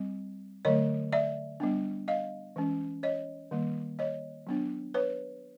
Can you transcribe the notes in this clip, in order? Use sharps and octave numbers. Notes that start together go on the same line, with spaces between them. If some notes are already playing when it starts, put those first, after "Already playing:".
Already playing: G3 C4
D3 F#3 A3 C#5 D#5
D5 E5
G3 B3 D4
D#5 F5
E3 G#3 C#4
C#5 D#5
D#3 G3 A#3
C#5 D#5
F#3 B3 D4
B4 C#5